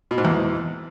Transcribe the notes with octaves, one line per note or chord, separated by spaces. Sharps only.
B2
G#2
E2